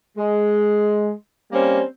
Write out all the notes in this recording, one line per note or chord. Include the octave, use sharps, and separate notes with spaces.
G#3
G3 A#3 C4 C#4